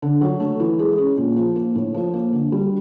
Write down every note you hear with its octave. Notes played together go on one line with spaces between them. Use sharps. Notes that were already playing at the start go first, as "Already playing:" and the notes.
D3
F#3
A3
E3
G#3
C#4
A#2
F3
A#3
A2
F3
A#3
D3
G3